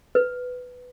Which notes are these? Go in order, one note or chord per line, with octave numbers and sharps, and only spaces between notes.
B4